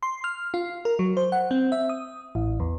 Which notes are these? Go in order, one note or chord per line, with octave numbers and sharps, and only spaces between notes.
C6
F6
F4
A#4
F#3
C5
F#5
C4
E5
D#6
A1
E2